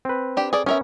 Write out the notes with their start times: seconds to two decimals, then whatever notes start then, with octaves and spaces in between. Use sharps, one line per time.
0.05 C4 B4
0.37 D4 G4
0.53 G#4 A4 D5
0.66 B3 C#4 A#4 E5